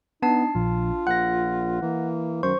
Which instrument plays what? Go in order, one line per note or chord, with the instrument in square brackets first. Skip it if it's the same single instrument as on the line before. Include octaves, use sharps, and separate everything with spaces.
[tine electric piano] B3 [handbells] D4 A5 C7 [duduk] D#4
[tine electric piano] A#1 [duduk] F4
[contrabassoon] A#1 [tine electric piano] F#5 [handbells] F#6 A#6
[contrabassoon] E3 [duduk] A#3
[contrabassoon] F#2 [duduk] D#3 [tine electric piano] C5 [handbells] C#6